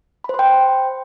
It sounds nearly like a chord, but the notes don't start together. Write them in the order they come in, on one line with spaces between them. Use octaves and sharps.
B5 C5 C6 G5